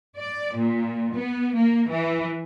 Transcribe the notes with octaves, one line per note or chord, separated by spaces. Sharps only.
D5
A#2
B3
A#3
E3